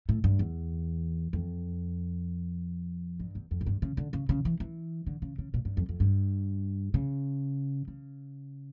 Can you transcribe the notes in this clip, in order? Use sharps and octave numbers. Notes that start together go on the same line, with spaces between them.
A2
G2
E2
F2
G2
E2
F2
A2
G2
C#3
D3
C#3
C#3
E3
E3
D3
C#3
C#3
A#2
G2
F2
F2
G2
C#3
C#3